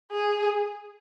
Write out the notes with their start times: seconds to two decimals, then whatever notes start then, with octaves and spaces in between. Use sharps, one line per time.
0.11 G#4